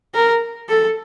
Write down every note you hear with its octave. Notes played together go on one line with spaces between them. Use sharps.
A#4
A4